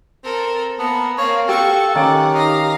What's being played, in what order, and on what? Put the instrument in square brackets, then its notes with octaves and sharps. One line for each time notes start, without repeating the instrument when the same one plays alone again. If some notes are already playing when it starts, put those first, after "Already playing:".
[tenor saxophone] C4 [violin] A4 A#4
[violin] A#3 A#4 [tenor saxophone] B3 [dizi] A5
[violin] A#3 C4 [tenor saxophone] C#5 [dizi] F5
[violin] F#4 C#6 [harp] G4 G5 E6 [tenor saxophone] A4
[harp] D#3 C#4 G5 [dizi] G4 [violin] F#5
[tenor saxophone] D#4 [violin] F5 A#6